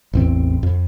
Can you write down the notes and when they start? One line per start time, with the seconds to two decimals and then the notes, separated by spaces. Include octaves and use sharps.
0.13 A1 E2 C4
0.63 F2